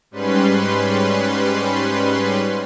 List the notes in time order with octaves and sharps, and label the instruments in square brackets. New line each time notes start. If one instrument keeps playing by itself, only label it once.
[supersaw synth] G#2 G3 C#4 B4 C6